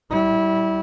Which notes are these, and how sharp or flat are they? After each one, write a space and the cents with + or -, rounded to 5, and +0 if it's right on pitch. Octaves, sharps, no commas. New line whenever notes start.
G3 -30 E4 -20